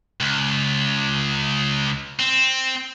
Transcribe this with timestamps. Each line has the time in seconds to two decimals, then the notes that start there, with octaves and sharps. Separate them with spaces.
0.21 C#2
2.20 C4